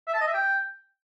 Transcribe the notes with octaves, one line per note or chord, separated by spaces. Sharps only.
E5
A5
D#5
E5
G5